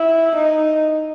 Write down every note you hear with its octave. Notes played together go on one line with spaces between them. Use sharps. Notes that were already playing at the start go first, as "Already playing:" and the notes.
Already playing: E4
D#4